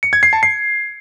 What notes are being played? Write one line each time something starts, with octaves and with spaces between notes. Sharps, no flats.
C#7
G#6
C7
A5
C7